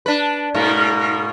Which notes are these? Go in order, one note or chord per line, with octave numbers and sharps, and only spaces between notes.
D4 B4
G#2 B2 A#3